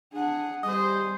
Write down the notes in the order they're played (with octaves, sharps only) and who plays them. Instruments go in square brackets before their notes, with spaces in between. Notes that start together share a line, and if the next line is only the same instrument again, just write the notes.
[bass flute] D4 [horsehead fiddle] G#4 F#5
[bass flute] G3 [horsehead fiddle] G#4 C5 [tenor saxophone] D#5